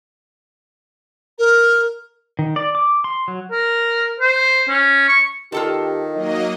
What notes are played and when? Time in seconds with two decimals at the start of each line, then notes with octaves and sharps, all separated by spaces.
1.38 A#4
2.39 D#3
2.56 D5
2.75 D6
3.04 C6
3.28 F#3
3.52 A#4
4.20 C5
4.68 C#4
5.09 C#6
5.52 D#3 F4 G4 A4 A5
6.14 F#3 A#3 D#4 D#5